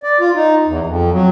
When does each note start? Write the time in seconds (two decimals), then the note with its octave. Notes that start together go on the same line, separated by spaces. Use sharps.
0.03 D5
0.20 F4
0.35 D#4
0.67 E2
0.86 F2
1.12 F#3